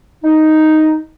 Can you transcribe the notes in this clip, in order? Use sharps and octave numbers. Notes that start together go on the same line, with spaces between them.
D#4